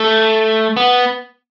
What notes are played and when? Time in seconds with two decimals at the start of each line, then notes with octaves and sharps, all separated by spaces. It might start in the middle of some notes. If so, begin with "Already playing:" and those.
Already playing: A3
0.77 B3